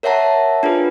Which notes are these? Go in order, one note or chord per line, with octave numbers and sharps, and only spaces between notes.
A#4 C#5 E5 F#5 A5 A#5
D4 F4 G#4 B4